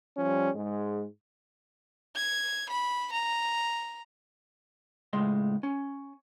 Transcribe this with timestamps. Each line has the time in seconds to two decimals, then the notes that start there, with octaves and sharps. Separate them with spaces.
0.18 F3 G3 C#4
0.55 G#2 G#3
2.16 G#6
2.70 B5
3.13 A#5
5.13 C#2 A2 G#3 D#5 C6
5.63 C#4